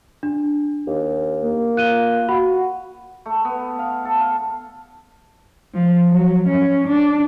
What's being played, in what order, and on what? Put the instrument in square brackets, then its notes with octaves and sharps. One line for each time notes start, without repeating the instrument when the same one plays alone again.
[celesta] D4
[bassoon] D#2
[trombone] A#3
[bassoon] F4 [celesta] F#6 D#7 G7
[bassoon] F#4 [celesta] B5
[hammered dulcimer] A3
B3
F5
A4
F5
[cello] F3
F#3
C#4
D4